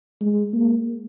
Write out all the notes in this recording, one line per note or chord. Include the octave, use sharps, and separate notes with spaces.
G#3
A#3